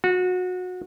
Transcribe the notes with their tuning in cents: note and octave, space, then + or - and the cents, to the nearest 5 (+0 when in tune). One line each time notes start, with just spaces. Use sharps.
F#4 -25